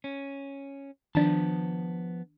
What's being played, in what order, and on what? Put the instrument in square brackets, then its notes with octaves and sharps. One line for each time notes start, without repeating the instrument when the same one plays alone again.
[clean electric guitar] C#4
[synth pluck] D#3 D4 [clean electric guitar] F3 B3 A5